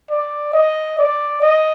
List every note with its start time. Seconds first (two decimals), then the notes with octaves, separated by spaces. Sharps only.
0.10 D5
0.53 D#5
0.99 D5
1.42 D#5